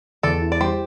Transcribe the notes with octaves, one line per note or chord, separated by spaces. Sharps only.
E2 A4 D5
E4
D5
G3 G4 C5